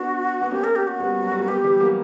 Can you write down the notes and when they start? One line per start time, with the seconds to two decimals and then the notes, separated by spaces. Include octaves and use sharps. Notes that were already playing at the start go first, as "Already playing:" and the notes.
Already playing: B3 D4 F#4
0.41 B3
0.51 A#3 C#4 G4
0.64 A#4
0.75 G4
0.87 F#4
1.00 G3 B3
1.24 F#3
1.32 G3
1.40 A#3
1.48 G3 B3 G4
1.64 E3 G3
1.80 F#3 A#3